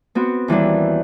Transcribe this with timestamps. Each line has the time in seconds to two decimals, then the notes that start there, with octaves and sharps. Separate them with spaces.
0.15 B3 C4 F#4
0.48 D#2 E3 G3 D4